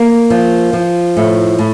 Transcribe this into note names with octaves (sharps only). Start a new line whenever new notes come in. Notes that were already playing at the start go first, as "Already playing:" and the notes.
Already playing: A#3
F3
F3
A2
A2